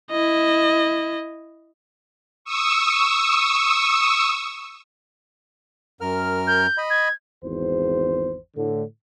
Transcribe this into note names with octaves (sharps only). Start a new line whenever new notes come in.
E4 D#5
C#6 D#6 E6
F#2 A#4 F6
G6
D#5 B5
G#6
G#1 E2 C5
A2 D3